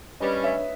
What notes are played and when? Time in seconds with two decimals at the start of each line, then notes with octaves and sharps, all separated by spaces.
0.20 G2 G3 C#4 B4 D#5
0.44 C#5 E5